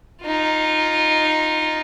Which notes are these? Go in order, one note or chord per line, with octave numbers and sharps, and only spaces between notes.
D#4 F4